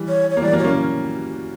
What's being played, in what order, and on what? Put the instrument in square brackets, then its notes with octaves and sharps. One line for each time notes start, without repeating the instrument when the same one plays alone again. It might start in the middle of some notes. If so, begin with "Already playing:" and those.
Already playing: [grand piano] E3 G3
[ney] C#5
C#5
[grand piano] A#3
[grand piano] E3 G3 [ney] D5
[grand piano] F#3 A#3
[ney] C#5
[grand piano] A#3 C#4